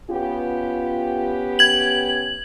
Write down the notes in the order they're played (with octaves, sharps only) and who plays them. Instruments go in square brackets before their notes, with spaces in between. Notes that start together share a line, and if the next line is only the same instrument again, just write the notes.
[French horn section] B3 C#4 G4 [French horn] F4
[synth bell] G#6 F#7